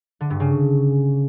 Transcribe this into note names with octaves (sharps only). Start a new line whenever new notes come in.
D3
G2
C#3